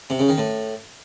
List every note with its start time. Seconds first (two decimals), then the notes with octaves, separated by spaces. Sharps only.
0.10 C3
0.19 C#3
0.28 D#3
0.38 A2